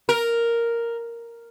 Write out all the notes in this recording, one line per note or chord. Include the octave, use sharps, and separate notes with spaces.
A#4